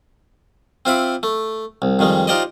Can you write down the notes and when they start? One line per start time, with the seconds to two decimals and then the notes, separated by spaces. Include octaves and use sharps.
0.85 C4 F4 E5 B5 D6
1.23 A3
1.82 C2
1.99 F2 D#3 G3 G#3
2.27 D#4 F4 G4 C5 D5 D#5